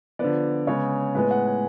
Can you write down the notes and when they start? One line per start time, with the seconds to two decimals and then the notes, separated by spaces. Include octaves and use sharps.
0.19 D3 F3 B3 D5
0.67 C#3 G#3 B3 C#5
1.15 A2 G#3 B3 B4
1.31 F#5
1.47 G#5